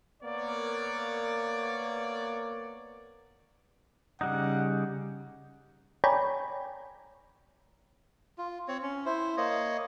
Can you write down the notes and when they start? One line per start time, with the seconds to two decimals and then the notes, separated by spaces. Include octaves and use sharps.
0.23 A#3 B3 A#4 C#5 D5
4.21 C#3 G3 D#4 F#5
6.04 C#5 D5 G5 G#5 A#5 B5
8.38 F4
8.68 C4 C#5
8.82 C#4
9.06 E4 C5
9.37 A#3 C#5 D#5